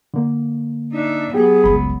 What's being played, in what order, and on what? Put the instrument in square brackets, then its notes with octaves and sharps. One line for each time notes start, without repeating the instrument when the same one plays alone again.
[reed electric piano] D3 A#3
[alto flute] D4 [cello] D#4 E5
[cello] F#3 B3 [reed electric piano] G4 [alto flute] G#4
[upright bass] G1 C#2 [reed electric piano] B5